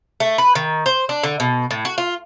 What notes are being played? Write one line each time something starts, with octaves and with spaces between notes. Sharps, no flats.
A3
B4
D#3
C5
D4
D3
B2
A2
F#4
F4